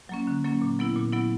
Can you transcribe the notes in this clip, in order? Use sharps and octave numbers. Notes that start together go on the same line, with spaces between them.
F#3 A#3 C#4
D3
F#3 A#3 C#4
A#2
F#3 B3 E4
A#2
F#3 B3 E4